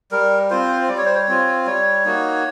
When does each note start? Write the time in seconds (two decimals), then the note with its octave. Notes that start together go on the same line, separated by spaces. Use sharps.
0.12 G3 A#4
0.50 C4 F4 C5
0.88 G3 D5
0.98 C#5
1.06 C5
1.15 C#5
1.28 C4 F4
1.66 G3 C#5
2.05 A#3 D#4 F#4